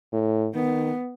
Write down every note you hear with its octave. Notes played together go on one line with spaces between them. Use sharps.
A2
D#3 B3